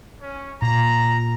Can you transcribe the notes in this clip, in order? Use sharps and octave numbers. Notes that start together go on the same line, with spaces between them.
C#4
A#2 A#5